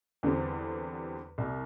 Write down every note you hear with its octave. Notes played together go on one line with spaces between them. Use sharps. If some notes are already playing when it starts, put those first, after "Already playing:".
E2 D3 G3 C4
C2 C3 G3